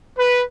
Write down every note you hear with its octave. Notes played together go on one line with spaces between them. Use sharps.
B4